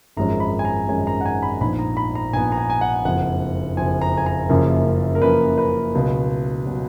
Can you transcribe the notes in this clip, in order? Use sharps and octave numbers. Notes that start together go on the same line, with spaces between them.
G#1 F#2 F3 G#3 C#4 A#5
B5
G#5
A#5
G#1 F#2 F3 G#3 C#4 G#5
A#5
F#5
G#5
B5
A#1 G#2 F3 B3 B5
A#5
B5
A#5
A#1 G#2 F3 B3 G#5
A#5
G#5
G#5
F#5
F#1 F2 F3 F#5
F#1 F2 F3 G#5
A#5
G#5
A#5
F#1 F#2 C#3 F3 A#3
A#4
F#1 F#2 C#3 F3 A#3 B4
B4
C#2 B2 F#3
B2 F#3